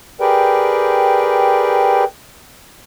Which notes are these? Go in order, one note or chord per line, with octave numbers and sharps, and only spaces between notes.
G4 G#4 A#4 B4 D5 G5